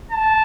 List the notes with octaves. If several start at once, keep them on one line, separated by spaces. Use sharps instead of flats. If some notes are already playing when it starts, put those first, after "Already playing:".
A5